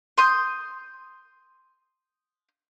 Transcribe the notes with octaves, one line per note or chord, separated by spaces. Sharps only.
C6 D#6 G6